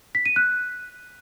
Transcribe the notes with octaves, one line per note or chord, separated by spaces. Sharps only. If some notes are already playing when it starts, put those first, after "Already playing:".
B6
D#7
F#6